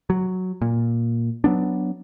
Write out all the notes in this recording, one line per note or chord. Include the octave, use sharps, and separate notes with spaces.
F#3
A#2
F#3 B3 D4